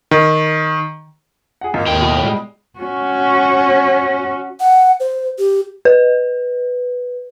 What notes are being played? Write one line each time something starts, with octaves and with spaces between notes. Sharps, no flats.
D#3
G#4 F#5
G#1 A#3 D#4
D#2 A2 D#3 G5
B2
G3 G#3
C#4 F#4
F#5
C5
G4
B4